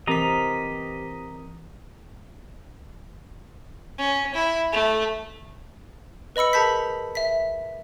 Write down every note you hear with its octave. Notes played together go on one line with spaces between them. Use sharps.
E3 C4 G4 A#4 D#5 A#5 B6
C#4
E4
A3
B4 D#5 B5 E6 C#7
G#4 A#4 A5 B5 G6 B6
E5 B6